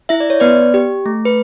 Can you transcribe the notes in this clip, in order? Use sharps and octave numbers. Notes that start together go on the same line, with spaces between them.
E4 E5
D5
C#5
B3 B4 D5
G4
A3
B4